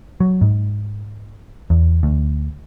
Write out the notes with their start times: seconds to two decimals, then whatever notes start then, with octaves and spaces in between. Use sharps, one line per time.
0.20 F#3
0.41 G#2
1.70 E2
2.03 D2